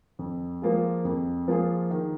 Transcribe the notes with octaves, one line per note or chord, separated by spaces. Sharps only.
F2
F3 A#3 F4 G#4
F2
F3 A#3 F4 G#4
D#3